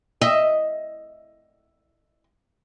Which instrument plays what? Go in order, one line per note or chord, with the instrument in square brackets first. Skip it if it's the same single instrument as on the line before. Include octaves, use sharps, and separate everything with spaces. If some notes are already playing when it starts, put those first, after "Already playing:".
[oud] D#5 E5